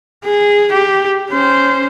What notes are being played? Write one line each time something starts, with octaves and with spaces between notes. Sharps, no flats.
G#4
G4
C#4 C5